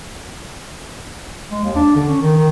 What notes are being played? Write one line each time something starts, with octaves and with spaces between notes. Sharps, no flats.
G#3
D#2
D4
D3
C#4
D#3
D#3